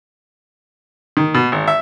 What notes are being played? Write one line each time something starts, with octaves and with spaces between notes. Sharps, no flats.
D#3
B2
G#1
E5